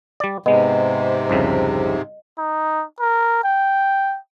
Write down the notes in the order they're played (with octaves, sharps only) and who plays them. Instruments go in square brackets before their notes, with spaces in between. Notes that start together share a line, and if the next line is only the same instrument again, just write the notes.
[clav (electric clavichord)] G3 D5
[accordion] G#2 C3 [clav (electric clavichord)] G#3 B3 [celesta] D#5
[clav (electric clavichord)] C2 F2 C#3
[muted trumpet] D#4
A#4
G5